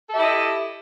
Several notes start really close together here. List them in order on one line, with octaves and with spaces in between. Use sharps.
A4 E5 G4 E4 D#5